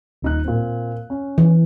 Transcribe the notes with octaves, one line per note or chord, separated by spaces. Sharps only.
D#1 D#4 F#6
A#2 C4
C#4
E3